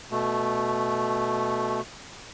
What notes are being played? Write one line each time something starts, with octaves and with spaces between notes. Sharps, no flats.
B2 A3